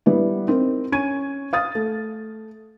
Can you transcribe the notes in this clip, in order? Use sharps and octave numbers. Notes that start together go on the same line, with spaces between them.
G3 B3 E4
C4 D#4 A#4
C#4 C#6 G#6 D#7
F5 D#6 A6
A3